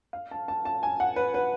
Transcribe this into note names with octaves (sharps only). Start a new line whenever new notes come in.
F5
A5
A5
A5
G#5
F#5
B4
B4